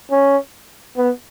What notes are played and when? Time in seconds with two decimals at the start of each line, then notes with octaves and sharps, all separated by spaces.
0.11 C#4
0.97 B3